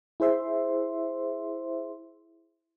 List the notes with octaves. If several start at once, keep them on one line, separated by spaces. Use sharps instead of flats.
E4 G#4 C5 E5 C6